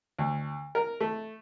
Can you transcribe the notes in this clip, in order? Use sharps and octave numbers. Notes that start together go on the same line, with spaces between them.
D2
A#4
A3